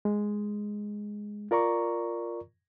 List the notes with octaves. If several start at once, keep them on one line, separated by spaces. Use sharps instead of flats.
G#3
F4 A#4 D5 A#5 C#6